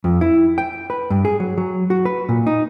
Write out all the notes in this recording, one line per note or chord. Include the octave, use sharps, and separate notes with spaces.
F2
E4
G5
B4
G2
G#4
F#3
F#3
F#4
B4
A#2
D#4